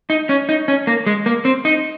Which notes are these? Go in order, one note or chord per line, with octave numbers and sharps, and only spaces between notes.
D#4
C#4
D#4
C#4
A#3
G#3
A#3
C4
D#4